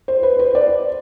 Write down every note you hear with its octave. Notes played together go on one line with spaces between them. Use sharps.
C5
B4
C5
D5